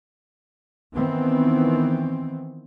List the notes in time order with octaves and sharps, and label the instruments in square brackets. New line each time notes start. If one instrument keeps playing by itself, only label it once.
[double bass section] D#3 E3 B3 C4